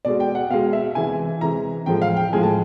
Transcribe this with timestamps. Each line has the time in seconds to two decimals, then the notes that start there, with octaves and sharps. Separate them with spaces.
0.05 B2 G#3 D5
0.20 G5
0.35 F#5
0.50 B2 F5
0.54 G#3
0.73 E5
0.95 C3 E3 G#3 G#5
1.41 C3 E3 G#3 A#5
1.86 A2 F3 G#3 G5
2.02 F5
2.17 G5
2.33 A2 F3 G#3 G#5
2.43 A5